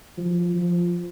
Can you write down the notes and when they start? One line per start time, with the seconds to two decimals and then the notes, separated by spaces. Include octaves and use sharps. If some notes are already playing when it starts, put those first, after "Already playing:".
0.18 F3
0.55 F3